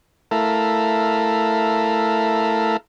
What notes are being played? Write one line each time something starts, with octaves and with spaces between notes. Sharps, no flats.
A3 E4 A4 A#4 F5